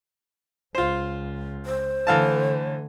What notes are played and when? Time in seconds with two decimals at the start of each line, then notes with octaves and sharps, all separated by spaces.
0.75 C#2 F4 C5
1.66 C5
2.07 D3 E3 A3 F5 A5